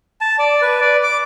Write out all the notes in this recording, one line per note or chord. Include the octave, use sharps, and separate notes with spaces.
A5
D5
B4
D5
D6